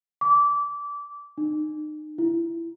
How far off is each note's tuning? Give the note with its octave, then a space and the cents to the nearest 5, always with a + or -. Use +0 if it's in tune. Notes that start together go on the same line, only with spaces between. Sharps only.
D6 -20
D#4 -35
E4 +20